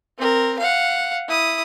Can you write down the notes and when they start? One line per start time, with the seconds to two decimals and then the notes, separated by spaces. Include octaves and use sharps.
0.19 C4 A#4
0.59 F5 F#5
1.28 E4 D#6